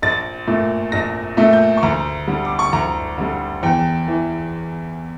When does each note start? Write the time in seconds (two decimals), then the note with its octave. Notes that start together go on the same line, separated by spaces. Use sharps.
0.02 A#1 A6
0.47 A#2 A3
0.92 A#1 A#6
1.37 A#2 A3
1.53 G6
1.77 C#6
1.83 D2 A#5
2.27 D3 G3
2.45 D6
2.59 C#6
2.73 D2 A#5
3.18 D3 G3
3.63 E2 G5
4.08 E3